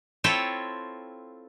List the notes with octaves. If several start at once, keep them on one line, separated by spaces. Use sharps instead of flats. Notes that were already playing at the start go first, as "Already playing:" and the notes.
C4 E4 F4 A4 C#5 G5